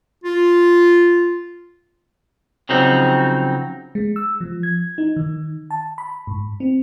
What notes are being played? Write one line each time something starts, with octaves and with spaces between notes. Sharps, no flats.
F4
C#3 F3 F#3 C4 D#4
G#3
E6
F3
G#6
D#4
D#3
A5
B5
G#2
C4